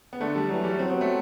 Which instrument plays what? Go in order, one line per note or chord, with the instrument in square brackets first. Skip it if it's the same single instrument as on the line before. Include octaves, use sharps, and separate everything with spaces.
[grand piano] B3
[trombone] D3 [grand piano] A3
[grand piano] G3
[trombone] E3 [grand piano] F#3
[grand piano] G3
[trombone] F#3 [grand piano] C4
[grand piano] B3
A3